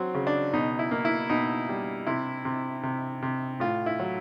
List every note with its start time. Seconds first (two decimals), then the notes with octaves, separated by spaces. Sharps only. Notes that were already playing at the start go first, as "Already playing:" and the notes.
Already playing: F#3 C4
0.14 C#3
0.27 D4
0.54 B2 D#4
0.79 E4
0.91 A#3
1.05 E4
1.30 B2 D#4
1.69 G3
2.07 C3 E4
2.45 C3
2.83 C3
3.22 C3
3.60 A2 F4
3.86 E4
4.00 F#3